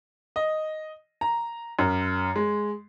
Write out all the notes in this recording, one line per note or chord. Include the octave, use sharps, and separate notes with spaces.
D#5
A#5
F#2
G#3